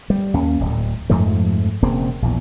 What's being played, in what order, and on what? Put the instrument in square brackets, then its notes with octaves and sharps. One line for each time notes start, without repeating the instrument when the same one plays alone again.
[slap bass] G3
D#2 A#3 C#4
D1
F2 G#2 F3 A3
E1 C#3 A#3 C4
A#1 E2